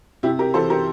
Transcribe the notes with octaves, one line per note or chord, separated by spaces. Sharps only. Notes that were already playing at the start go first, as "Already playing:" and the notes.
C3 E4 G4
G4 A#4
E3 A4 C5
G4 A#4